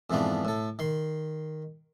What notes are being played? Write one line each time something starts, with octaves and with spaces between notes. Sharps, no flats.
F2 G#2 E3 F3 B3 D4
A2 A4
D#3 C6